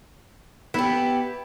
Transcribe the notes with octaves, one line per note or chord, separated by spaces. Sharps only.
B3 E4 G4